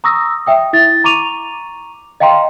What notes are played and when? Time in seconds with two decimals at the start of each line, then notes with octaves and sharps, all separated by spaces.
0.04 A#5 C#6 D#6 E6 A#6
0.47 E5 G5 D#6
0.73 E4 A6
1.04 A#5 C#6 D6 D#7 F7
2.20 D#5 F5 G5 A#5 C6